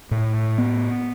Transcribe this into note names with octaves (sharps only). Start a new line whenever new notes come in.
A2
B3